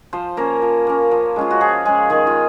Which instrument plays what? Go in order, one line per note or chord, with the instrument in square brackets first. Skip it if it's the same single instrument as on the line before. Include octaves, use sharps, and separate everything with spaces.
[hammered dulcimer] F3 C5
A#3 C#4 A#4
F3
A#3 C#4
F3
G#3 C#4 F4
F#4
F3 G#4
G#3 C#4 G#4
D#3 G#4
F4